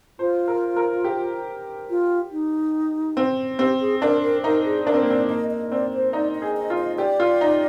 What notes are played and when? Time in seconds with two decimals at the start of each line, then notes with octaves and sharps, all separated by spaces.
0.19 F4 C5
0.48 A#4
0.76 A#4
1.04 G4
1.90 F4
2.31 D#4
3.17 C4
3.59 C4 G4
3.81 G#4
4.02 D4 A#4
4.22 A#4
4.44 D#4 A#4
4.65 G#4
4.86 D4 A#4
4.94 C4
5.02 A#3
5.07 C4 D5
5.29 A#3 D#5
5.51 D#5
5.71 C4 D5
5.93 C5
6.13 D#4 D5
6.35 D#5
6.42 G#4
6.57 D#5
6.70 F4
6.78 D#5
6.98 G4 D5
7.20 F4
7.41 D#4